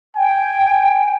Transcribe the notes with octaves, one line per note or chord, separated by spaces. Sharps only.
G5 G#5